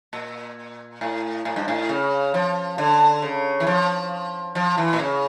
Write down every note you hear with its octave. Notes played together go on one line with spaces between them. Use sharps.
A#2
A2
A2
G2
A2
C#3
F3
D3
C#3
E3
F3
F3
E3
A#2
C#3